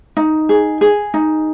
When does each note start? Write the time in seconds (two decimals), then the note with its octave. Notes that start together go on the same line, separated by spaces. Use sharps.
0.17 D#4
0.49 G#4
0.81 G#4
1.14 D#4